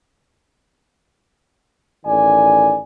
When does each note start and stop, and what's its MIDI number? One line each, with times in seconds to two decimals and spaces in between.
2.06 2.79 33
2.06 2.79 51
2.06 2.79 74
2.06 2.79 80